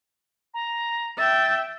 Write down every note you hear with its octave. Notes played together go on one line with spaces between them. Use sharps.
A#5
E5 G5 A6